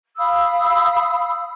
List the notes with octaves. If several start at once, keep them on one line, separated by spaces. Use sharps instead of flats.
F5 B5 D#6 E6